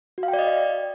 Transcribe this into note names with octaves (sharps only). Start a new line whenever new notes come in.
F#4
F5
G5
D5
D#5